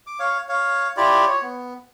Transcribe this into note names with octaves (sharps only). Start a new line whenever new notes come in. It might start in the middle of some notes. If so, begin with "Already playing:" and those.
D6
C#5 F5
C#5 F5
E4 F4 G4 D5
C#5
B3